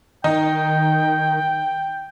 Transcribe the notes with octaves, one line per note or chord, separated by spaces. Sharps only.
D#3 D#4 G5